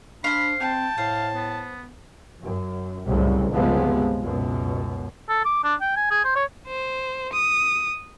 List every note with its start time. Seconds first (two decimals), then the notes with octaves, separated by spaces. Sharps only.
0.24 D4 C5 F5 B5
0.60 C4 G5 A5
0.98 A2 C5 F5
1.34 B3
2.41 F#2
3.07 C2 F#2 A2 C#3
3.52 G1 C#2 C3 F3 G#3 B3
4.22 C#2 F#2 B2
5.29 A4
5.45 D6
5.64 D4
5.81 G5
5.96 G#5
6.11 G#4
6.25 C5
6.36 C#5
6.67 C5
7.33 D#6